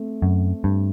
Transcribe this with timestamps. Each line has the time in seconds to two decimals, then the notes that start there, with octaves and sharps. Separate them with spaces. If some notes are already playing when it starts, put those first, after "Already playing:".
Already playing: A3 C4
0.22 F#2
0.64 G2